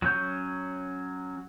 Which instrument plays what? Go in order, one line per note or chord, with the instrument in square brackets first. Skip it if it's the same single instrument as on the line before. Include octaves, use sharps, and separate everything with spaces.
[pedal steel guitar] F#3 C#4 G6